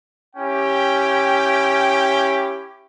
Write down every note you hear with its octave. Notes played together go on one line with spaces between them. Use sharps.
C#4 E4 G4 G5